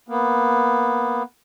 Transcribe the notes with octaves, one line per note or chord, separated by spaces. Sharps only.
A#3 B3